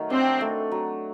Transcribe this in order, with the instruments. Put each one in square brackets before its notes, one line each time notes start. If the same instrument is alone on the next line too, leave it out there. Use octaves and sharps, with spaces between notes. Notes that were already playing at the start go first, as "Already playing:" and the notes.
Already playing: [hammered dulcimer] D#3 F#3 A3
[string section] C4 [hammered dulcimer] D4
[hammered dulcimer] A3
F#3